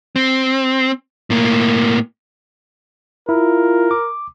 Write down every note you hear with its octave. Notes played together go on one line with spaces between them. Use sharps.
C4
A2 A#3
E4 F4 A#4
D6